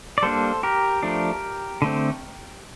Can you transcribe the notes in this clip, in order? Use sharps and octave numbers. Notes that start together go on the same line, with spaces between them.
D5
G3 A#3 D4 A4 C5
G4 A#4
F3 A3 D4
D3 A3 C4